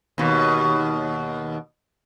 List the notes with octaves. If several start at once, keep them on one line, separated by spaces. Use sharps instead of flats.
D#2 B2